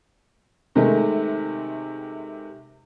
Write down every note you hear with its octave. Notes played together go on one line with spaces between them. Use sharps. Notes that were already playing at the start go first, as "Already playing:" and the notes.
C3 D#3 G#3 A3